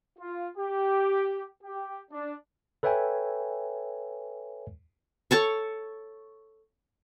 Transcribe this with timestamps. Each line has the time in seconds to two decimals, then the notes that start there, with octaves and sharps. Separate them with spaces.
0.19 F4
0.58 G4
1.63 G4
2.12 D4
2.83 A4 B4 C#5 E5 G5 G#5
5.31 A4 C#5 A5 C#6